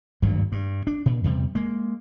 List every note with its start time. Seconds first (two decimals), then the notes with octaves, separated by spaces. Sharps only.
0.22 G#1 D2 G2 F#3
0.52 G2
0.87 D4
1.06 A#2
1.24 E2 C3 G3
1.55 G#3 A#3